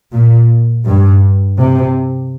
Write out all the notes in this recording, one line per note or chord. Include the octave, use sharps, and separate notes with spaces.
A#2
G2
C3